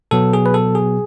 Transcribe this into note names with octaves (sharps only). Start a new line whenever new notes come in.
B2 F#3 B3 A4
G#4
B4
A4
G#4